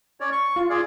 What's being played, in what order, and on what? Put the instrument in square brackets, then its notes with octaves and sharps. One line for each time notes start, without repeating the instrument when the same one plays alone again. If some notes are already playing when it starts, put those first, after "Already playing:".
[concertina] C#4 C#5 D5
C#6
[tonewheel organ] F4
[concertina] G#4 D5